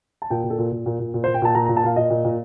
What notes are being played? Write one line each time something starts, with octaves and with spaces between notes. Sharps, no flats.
A5
A#2 G5
A#2
A4
A#2
A#2
A#2
A#2
A#2
C5
A#2
G5
A#2 A5
A#2 A#5
A#5
A#2
A5
A#2 F5
A#2 D#5
A#2
A#2